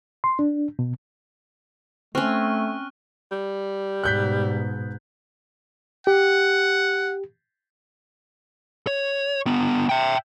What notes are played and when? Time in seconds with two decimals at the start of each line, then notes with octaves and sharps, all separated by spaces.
0.24 C6
0.39 D4
0.79 B2
2.15 A3 C4 C#4 C#6 F6 F#6
3.32 G3
4.04 G#2 B2 F#6 G6 B6
6.07 G4 F#5
8.87 C#5
9.46 D3 B3
9.89 E5 G5